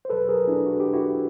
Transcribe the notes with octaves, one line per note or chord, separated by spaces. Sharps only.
C5
E2 B2 F#3 A4 B4
G#4 A#4
D4 E4
F#4
G4
E4 F#4